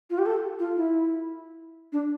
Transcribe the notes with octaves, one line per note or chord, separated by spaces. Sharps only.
F4
G4
A4
F4
E4
D4